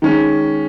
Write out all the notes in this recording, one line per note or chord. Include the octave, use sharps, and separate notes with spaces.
D#3 G#3 C#4